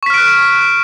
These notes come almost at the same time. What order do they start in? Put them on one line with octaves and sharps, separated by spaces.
C#6 B6 F6 D7 F#6